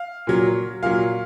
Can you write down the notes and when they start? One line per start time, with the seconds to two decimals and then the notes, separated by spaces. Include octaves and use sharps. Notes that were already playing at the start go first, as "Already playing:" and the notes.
Already playing: F5
0.27 A#2 F#3
0.83 A#2 F#3 F5